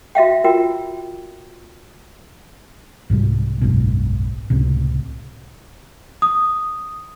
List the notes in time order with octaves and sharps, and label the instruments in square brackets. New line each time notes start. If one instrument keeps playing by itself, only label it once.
[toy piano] F#4 E5 F5 G5
F4 F#4 A#4 G5
[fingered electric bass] C2 G#2 C3 G3
F#1 B1 G#2 B2
C#2 A2 C3
[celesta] D#6